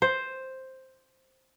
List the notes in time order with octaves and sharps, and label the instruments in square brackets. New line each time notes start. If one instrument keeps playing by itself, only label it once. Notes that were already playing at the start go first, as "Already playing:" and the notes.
[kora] C5